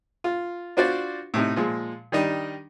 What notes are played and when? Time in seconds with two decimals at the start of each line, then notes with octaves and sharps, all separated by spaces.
0.24 F4
0.77 D4 F4 F#4 C5 D5
1.34 A2 C3 D#4
1.56 A#2 F3 G#3
2.12 D#3 G3 D4 D#4